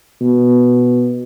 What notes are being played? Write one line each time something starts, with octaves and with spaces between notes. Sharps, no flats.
B2